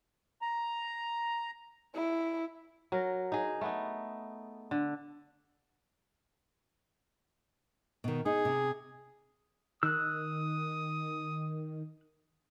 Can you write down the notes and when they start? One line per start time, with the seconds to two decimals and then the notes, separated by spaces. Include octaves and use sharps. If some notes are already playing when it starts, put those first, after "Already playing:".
0.42 A#5
1.95 E4
2.92 F#3 A#4
3.32 D#4 G#4
3.61 A3 B3 D#4
4.71 D3
8.04 B2 D#3
8.26 D#4 G#4
8.45 C3
9.83 D#3 D#6 E6 F#6